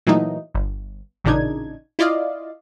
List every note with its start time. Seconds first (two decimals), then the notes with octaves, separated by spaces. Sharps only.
0.07 A#2 E3 F#3 A3 D#4
0.54 G1
1.24 A1 A#2 C#3 D4 D#4 G#6
1.99 E4 F4 D5 D#5 F5